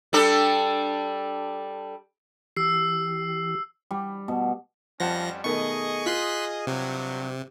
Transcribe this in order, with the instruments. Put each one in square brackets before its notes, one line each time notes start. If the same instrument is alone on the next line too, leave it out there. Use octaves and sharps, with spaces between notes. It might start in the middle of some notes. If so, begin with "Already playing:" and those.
[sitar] G3 D4 A4
[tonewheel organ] E3 G4 [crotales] E6 C7
[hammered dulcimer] G3
B2
[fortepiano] F2 F#5 A5 [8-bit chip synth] F3 A#6 [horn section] G3 C4 C#4
[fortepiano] B2 D#3 A3 [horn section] G#4 D#5 [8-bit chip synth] C#6
[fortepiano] F4 [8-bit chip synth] C6 F#6 B6
[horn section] G2 F#3 [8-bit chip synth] C3